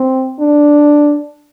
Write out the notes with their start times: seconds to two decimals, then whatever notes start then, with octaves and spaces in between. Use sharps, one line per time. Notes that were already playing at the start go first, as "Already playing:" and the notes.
Already playing: C4
0.40 D4